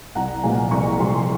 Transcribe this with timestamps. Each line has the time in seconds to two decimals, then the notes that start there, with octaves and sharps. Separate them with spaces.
0.15 C2 F#5 A#5
0.43 A#2 F3 G#3 F5 G#5
0.71 C2 A#5 C#6
0.99 A#2 F3 G#3 G#5 C6
1.21 C6